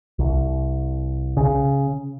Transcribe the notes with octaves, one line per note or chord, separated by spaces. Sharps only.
C2
C#3